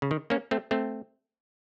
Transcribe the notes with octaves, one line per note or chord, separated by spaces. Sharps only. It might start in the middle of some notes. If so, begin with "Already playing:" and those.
C#3
D#3
A#3 C#4
A3 C4
A3 C4